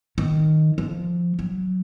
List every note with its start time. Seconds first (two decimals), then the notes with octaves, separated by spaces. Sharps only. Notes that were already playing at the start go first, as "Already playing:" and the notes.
0.18 D#3
0.78 F3
1.39 F#3